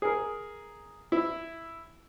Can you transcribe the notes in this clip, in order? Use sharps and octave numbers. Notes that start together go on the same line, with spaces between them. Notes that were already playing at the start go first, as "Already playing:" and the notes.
G#4 A#4
E4